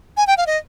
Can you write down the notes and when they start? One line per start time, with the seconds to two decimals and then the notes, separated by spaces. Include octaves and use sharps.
0.17 G#5
0.27 G5
0.37 F5
0.47 D#5